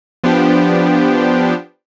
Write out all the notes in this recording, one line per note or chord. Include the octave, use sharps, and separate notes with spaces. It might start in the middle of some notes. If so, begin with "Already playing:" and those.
F3 B3 D4 G4